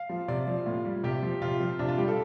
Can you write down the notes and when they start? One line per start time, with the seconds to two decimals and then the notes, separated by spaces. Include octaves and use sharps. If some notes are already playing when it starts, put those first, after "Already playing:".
Already playing: F5
0.09 F3
0.28 C3 D5
0.47 F3
0.66 A2 F4
0.85 G3
1.04 C3 G4
1.22 F3
1.41 C3 F4
1.60 F3
1.79 C3 D4
1.88 F4
1.98 G3 G4
2.08 A4